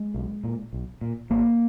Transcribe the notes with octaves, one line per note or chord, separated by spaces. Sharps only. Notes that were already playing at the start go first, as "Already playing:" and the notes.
Already playing: G#3
B1
A#2
B1
A#2
G#1 A#3